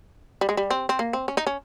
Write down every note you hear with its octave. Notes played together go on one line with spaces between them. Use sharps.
G3
G#3
G3
C4
C4
A#3
C4
C#4
D#4
C#4